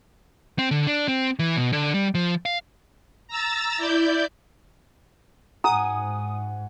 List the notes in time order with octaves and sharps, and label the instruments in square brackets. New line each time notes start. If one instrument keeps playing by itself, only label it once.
[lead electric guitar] C4
D3
D4
C4
E3
B2
D3
G3
F3
F5
[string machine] A#5 E6 A6
E4 D5 G6
[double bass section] G#2 [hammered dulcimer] F#5 G#5 [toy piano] A#5 [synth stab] D#6